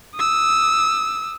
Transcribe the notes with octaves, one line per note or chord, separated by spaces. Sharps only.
D#6 E6